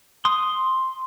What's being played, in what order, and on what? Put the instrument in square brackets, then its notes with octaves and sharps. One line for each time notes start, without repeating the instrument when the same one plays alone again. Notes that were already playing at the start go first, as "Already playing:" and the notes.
[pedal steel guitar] C6 D#6